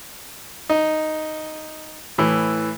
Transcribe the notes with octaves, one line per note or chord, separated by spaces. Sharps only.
D#4
A2 E3